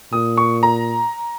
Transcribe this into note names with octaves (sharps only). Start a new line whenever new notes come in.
A#2 D#6
C#6
A#5